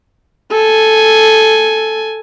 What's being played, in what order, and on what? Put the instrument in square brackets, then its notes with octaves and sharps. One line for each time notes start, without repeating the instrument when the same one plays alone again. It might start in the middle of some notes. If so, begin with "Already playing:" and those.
[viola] A4 G#5